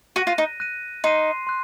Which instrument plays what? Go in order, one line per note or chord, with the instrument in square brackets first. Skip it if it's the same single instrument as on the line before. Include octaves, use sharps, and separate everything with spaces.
[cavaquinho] F#4 [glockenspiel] F#6 A#6 D#7
[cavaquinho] F4
D#4
[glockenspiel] F#6 A#6 D#7
[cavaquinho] D#4 [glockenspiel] C6 F#6 C7 D#7
[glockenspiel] C6 F#6